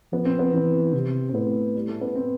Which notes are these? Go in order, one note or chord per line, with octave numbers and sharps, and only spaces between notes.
F3 B3
C4
B3
E3 C4
C3
C4
A2 B3
G3
A3
B3
C4